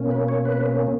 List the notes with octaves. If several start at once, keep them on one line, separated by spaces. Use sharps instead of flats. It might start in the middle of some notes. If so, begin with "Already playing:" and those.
Already playing: B2 A#3 C#4
B4
C#5
B4